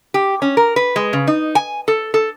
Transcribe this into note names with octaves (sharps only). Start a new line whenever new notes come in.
G4
C#4
A#4
B4
G#3
C#3
D#4
G#5
A4
A4